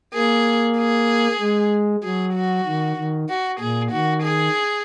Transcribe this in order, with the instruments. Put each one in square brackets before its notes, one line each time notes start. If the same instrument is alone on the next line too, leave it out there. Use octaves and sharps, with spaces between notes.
[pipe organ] A#3 [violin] G#4
[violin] G#4
[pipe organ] G#3
[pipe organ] F#3 [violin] G#4
[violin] F#4
[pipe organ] D#3
D#3
[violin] F#4
[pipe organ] A#2 [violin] G#4
[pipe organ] D#3 [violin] F#4
[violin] G#4